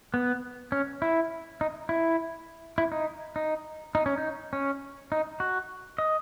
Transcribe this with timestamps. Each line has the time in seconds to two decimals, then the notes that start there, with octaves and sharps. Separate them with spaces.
0.14 B3
0.72 C#4
1.02 E4
1.61 D#4
1.89 E4
2.78 E4
2.92 D#4
3.36 D#4
3.95 D#4
4.06 C#4
4.18 D#4
4.53 C#4
5.12 D#4
5.40 F#4
5.98 D#5